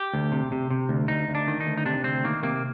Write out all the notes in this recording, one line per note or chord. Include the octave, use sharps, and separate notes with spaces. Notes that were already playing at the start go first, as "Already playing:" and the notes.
Already playing: G4
D2
C3
C3
C3
D2
D2 D#4
D2
D4
D#3
D#4
D2
D#4
C3 D4
D2 C4
D#3 A#3
C3 A#3